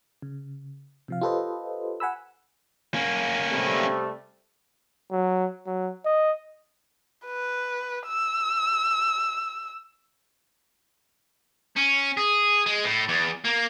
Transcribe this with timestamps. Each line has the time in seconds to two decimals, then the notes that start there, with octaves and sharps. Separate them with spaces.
0.22 C#3
1.08 C3 F3 F5
1.21 F4 G4 A4 B4 C5 D#5
2.00 F#5 G#5 B5 E6
2.94 A#3 C#4
3.50 C3 G3 A3
5.12 F#3
5.67 F#3
6.05 D#5
7.26 B4
8.07 E6
11.76 C#4
12.17 G#4
12.66 G#3
12.85 A2
13.08 E2
13.44 A#3